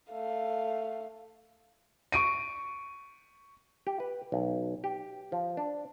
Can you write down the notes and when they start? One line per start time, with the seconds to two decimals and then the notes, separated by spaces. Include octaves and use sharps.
0.11 A3 F5
2.12 C#6 D7 D#7
3.87 G4
4.00 B4
4.32 B1
4.84 G4
5.32 F3
5.57 D4